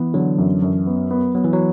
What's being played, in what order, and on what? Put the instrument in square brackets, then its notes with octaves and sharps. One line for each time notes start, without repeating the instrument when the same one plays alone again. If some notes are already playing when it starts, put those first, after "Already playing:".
Already playing: [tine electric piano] E3 [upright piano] B3
[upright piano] D3 [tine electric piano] F#3
[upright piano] F#2
F#2
B3
B3
[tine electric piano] F#3 [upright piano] B3
[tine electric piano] E3
F#3